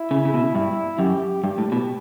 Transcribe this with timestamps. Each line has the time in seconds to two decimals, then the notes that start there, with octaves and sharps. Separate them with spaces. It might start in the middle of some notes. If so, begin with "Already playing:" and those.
Already playing: E4
0.11 C#3
0.25 C#3
0.34 B2
0.55 G2 E4
0.99 F#2 G4
1.44 G2 G4
1.58 A2
1.72 B2